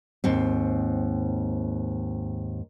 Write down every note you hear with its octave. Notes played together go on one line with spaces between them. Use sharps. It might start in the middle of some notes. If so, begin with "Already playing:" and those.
D#2 G#2 C4